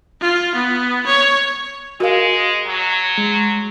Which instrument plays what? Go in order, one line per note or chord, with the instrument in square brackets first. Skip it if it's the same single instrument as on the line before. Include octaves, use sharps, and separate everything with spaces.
[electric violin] F4
B3
C#5
[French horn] G#3 [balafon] F#4 A#4 F5
[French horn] F#3
[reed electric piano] G#3